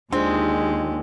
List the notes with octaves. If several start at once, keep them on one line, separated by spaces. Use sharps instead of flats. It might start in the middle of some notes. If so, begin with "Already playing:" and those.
D#2 G#3 C4 D4 F4 G#4